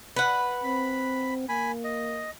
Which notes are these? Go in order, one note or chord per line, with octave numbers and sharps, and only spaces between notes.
B4 F#5
C4 B5
A#3 G#5 B5
D#5